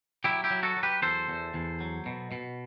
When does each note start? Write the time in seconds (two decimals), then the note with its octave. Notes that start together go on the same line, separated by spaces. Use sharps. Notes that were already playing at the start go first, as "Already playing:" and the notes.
0.24 F#3 E4 G4
0.44 E4 G4
0.51 F#3
0.63 F#4 A4
0.77 F#3
0.83 G4 B4
1.02 E2 A4 C5
1.28 E2
1.54 E2
1.81 F#3
2.06 B2
2.32 B2